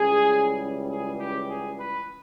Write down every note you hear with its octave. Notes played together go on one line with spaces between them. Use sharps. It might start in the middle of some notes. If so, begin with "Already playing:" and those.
Already playing: C#2 C#3 E3 G3 G#4
G#4
G4
G#4
B4